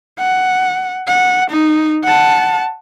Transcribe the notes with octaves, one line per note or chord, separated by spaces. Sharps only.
F#5
F#5
D#4
F#5 A5